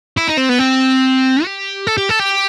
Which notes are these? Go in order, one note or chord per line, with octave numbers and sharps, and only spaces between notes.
E4
D#4
C4
B3
C4
G4
A4
G4
A4
G4